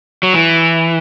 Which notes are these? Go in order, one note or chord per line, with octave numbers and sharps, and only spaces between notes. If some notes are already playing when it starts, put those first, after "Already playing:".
F#3
E3